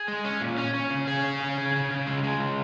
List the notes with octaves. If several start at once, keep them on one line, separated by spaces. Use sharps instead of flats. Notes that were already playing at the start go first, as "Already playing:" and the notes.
Already playing: G#4
G#3
C#4
A#2
C#4
C#4
C#3
C#3 G#4
C#4
C#3
C#3
C#3
C#3
G#3
G#3
C#3